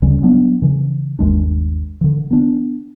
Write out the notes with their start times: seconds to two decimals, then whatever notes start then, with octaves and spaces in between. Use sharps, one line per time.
0.02 D2 C#3 G3 C#4
0.22 F#3 G3 B3 D4
0.62 C#3 E3
1.19 G1 D#2 G#3 D4
2.01 D3 E3
2.31 B3 D4